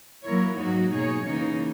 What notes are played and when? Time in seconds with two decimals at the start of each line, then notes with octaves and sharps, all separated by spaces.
0.24 F#3 A#3 E4 A#4 C#5
0.58 G#2 F#3 A#3 D#4 F#4
0.92 B2 A#3 D#4 G#4 C#5
1.26 C#3 E3 A#3 D#4